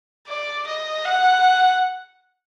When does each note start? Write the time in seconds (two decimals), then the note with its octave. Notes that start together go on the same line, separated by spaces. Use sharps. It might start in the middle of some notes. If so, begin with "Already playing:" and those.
0.28 D5
0.67 D#5
1.05 F#5